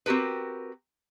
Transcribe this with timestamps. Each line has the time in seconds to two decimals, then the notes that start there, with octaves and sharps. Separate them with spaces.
0.06 C4 F#4 G4 A#4 B4